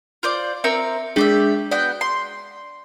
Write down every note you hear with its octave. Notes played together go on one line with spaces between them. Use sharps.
F4 C5 D5
C4 A#4 E5 E6 C#7
G#3 D4 G4 G#4 D5 E5
B3 F#4 D5 G5
C6